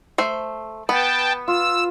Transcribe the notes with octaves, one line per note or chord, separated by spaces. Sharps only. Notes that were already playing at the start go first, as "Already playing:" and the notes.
A3 C5
B3 B4 G5 A5
F4 E6